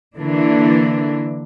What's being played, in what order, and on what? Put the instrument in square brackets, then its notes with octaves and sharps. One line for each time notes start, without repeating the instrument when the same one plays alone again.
[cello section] D3 E3 A#3 D4